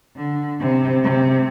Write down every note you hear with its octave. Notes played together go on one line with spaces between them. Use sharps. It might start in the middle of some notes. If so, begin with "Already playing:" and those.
D3
C3
C3